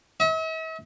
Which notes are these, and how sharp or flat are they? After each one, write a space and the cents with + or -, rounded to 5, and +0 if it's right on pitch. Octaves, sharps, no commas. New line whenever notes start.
E5 -45